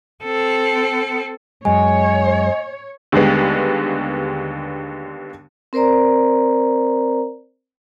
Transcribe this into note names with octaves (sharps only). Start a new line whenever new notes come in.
C4 A4
F#2 G#3 C#5 D#5 G#5
D#2 D3 G3 G#3 B3
C4 A#4 C5 D5 A#5